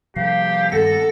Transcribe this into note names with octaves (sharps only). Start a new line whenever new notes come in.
C3 F3 G3 G4 F5
G2 D#3 G3 A4 F#5 A#6